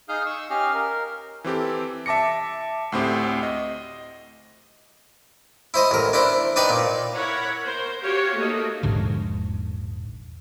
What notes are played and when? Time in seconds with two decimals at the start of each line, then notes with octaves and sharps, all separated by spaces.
0.09 D#4 G#4 F5 D#6 F6 G6
0.26 C#6 E6
0.50 C#4 G4 D#5 F5 F6
0.74 A#4
1.44 E3 C4 G4 A4
2.06 E5 A5 D6 A#6 C#7
2.92 D2 A2 C4 G4
3.43 D#5
5.74 E4 C5 D#5
5.91 A1 A#4
6.13 D4 E4 C5
6.56 D4 D#4 B4 D5 G5
6.69 A#2
7.14 E4 A#4 C#5 F#5 B5
7.62 A#4 C5
8.01 F#4 G4 C#5 F5
8.36 A3 A#3 D#4 F#4
8.83 E1 A#1 G#2 D3